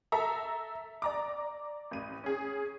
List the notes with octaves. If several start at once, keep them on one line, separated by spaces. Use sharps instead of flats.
A4 E5 A#5
D5 A#5 D6
A1 D#7
C#4 G#4